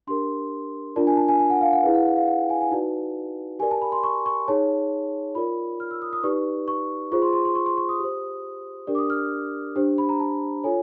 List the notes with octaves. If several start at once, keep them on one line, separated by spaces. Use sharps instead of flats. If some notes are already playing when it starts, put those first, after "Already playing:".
D4 G4 A#4 C6
D4 F4 A#4 D5 A5
G#5
A5
G#5
G#5
F#5
F5
F#5
E4 G#4 B4 F5
F#5
F#5
F5
F#5
G5
G#5
G#5
D#4 F#4 B4 D5 A5
G4 A#4 D5 G#5
A5
B5
C6
C#6
C#6
D#4 G#4 C#5 A5
F4 A#4 D5 B5
F6
E6
D#6
D#6
D#4 G4 B4 D5 C#6
C#6
F4 G#4 C5 C#6
C6
C6
C6
C#6
C6
C#6
D#6
G4 C5
D4 G4 A#4 D5
D6
D#6
F6
D4 G4 C5
B5
A#5
A5
F4 A4 C#5 G#5